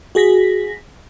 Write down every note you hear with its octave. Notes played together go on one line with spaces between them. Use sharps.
F#4 G#4 A#6 B6